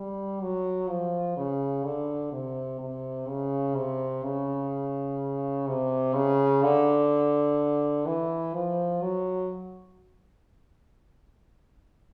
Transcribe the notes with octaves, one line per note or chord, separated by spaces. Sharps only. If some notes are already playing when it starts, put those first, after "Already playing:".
Already playing: G3
F#3
F3
C#3
D3
C3
C3
C#3
C3
C#3
C3
C#3
D3
E3
F3
F#3